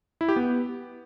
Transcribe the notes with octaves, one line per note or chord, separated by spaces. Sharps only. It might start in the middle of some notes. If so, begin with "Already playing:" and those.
E4
G4
B3